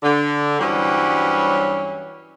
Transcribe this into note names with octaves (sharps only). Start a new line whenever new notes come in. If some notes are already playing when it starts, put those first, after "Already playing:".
D3
G2 E3 F#3 G3 C4 C#4